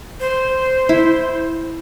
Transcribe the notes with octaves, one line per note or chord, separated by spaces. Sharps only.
C5
E4